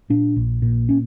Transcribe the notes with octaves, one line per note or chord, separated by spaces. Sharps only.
A#2 D4
A#1
A#2
C#4